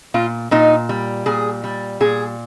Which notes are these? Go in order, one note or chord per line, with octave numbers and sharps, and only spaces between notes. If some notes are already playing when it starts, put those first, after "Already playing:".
A#2 F4
A#2 D#4
G3
A#2 G#4
G3
A#2 G#4